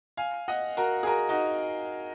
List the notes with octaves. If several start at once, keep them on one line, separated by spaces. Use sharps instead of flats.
F5 G#5
D#5 F#5
F#4 A#4
G#4
F#4 A#4
D#4 F#4